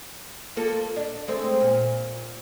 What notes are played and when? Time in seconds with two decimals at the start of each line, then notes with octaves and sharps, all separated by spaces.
0.57 A#3 F4 A4
0.96 D4
1.28 G#3 A3 C4
1.61 A#2